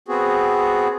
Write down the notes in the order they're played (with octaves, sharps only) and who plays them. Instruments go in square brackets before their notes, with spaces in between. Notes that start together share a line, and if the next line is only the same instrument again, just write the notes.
[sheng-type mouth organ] B3 C4 F#4 G#4